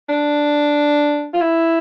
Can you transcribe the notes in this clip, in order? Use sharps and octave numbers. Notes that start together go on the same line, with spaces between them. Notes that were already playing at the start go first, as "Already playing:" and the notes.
D4
F4
E4